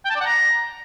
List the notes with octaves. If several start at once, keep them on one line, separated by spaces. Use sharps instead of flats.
G5
A5
D5
F#5
A#5